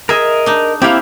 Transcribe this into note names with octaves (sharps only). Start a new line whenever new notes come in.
G#4 A#4 D#5 E5
D4 D#4
A#3 C4 E4 G4 F5